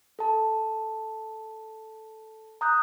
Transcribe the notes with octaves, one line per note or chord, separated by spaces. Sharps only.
A4 A5
A#5 D#6 F#6 G6